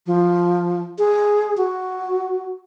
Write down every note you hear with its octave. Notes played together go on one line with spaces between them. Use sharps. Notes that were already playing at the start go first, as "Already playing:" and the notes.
F3
G#4
F#4